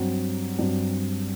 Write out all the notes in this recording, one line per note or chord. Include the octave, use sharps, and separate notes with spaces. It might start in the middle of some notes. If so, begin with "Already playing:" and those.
Already playing: G2 F#3 C4
G2 F#3 C4